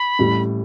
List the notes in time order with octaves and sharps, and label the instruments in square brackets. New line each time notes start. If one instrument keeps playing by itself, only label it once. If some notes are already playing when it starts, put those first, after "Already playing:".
Already playing: [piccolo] B5
[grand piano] A1 A2 G3